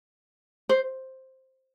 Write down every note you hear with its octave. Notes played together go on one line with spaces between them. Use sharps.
C5